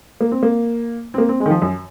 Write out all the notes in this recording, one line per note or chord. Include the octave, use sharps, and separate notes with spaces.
A#3
C4
A#3
C4
A#3
C4
G#3
D#3
F3
F#2